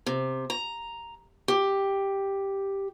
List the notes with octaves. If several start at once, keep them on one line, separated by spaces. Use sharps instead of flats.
C3
A#5
G4